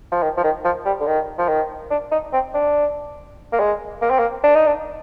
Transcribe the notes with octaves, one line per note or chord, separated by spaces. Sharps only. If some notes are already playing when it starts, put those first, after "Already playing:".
F3
D#3
F3
D#3
F3
G3
D3
D#3
F3
D#3
D4
D#4
C4
D4
A#3
G#3
A#3
C4
A#3
D4
D#4
D4